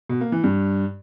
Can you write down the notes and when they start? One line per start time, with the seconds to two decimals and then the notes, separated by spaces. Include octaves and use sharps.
0.09 B2
0.21 A#3
0.32 E3
0.44 G2